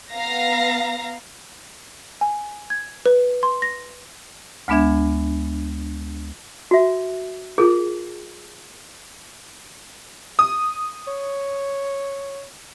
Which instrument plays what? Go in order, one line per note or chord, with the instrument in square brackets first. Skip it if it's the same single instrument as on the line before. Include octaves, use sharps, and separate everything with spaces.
[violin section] B3 F5 A#5 A#6
[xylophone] G#5
G#6
B4
C6
A#6
[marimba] D2 G#3 B3 D4 E5 G#6
[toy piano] F#4 E5
[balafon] F4 A#4 [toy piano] G#4
[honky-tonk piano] D#6
[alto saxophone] C#5